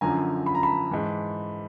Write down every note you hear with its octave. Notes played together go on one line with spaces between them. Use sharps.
F#2 D3 F3 G#5 A#5
B5
A#5
A5 B5
G#2 E3